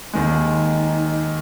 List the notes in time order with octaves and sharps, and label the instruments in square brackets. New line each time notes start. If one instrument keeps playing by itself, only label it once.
[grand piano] D#2 D#3 G#3 [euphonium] D#4